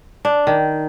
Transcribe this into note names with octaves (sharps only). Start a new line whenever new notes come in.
D4
D#3